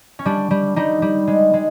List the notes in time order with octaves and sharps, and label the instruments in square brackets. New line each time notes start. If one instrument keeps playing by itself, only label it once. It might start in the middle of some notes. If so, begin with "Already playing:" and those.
[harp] C#4
G3 D4
G3
G3 D#4
G3
G#3
G#3